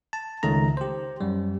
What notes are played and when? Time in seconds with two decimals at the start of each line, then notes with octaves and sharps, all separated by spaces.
0.13 A5
0.43 C#2 D#3 A3 A#5
0.77 G4 C5
1.21 F#2 G3